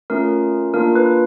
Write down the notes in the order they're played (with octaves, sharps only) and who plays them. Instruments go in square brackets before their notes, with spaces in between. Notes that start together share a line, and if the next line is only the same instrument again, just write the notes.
[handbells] A3 C#4 F4 A#4
A#3 D4 F4 A#4
B4